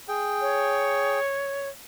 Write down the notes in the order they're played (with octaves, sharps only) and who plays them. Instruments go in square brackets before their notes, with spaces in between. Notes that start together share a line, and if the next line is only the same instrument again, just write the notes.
[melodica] G#4 G5
[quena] C#5